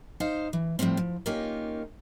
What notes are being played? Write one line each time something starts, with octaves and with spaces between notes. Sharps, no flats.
D#4 C5 F5
E3
A2 F3 G3 A3 C4
F3
A#3 C#4 D#4 F4 G4 A#4